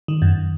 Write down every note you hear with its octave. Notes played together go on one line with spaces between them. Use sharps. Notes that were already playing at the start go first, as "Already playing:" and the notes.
D#3
F#2